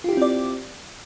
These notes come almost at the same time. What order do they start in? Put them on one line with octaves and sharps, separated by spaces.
F4 G4 E4 C4 D5